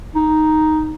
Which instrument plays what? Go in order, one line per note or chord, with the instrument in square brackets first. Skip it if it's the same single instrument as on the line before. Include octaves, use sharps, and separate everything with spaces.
[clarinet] D#4